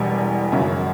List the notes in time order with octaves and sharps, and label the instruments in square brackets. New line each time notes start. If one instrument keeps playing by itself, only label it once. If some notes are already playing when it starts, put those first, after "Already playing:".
Already playing: [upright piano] E1 E2 B2 G3 G#5
G#1 F#2 C#3